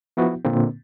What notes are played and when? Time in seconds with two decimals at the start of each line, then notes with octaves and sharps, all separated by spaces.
0.17 F3 B3 E4 F#4
0.45 A#2 D3 A#3 C4